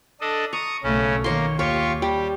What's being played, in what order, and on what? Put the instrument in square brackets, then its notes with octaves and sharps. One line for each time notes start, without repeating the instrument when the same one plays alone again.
[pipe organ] D4 A4 D#5
[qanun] A#5 [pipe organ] C#6 D#6
[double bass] B1 A3 [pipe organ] C#3 C#4
[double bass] D#3 [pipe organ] A#3 [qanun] C#5 C6
[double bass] D#2 [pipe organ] F4 G4 C#6 [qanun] C#5
[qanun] G3 [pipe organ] G4